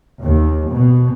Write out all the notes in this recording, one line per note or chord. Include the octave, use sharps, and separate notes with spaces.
D#2
B2